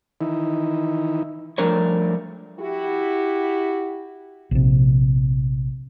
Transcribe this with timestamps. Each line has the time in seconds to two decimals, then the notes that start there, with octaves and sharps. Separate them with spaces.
0.21 D#3 E3 D#4 E4
1.58 F3 G3 A3 D4 A#4 C#5
2.59 E4 F#4 G4
4.51 A#1 C3